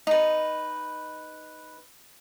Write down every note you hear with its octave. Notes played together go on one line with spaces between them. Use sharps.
D#4 B4